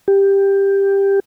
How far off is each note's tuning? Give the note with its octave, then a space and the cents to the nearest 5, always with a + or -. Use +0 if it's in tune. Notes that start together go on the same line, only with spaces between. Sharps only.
G4 +10